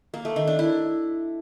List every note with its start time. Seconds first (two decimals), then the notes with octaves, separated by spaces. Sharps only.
0.14 A#3
0.25 A3
0.36 D#3
0.47 D4
0.59 E4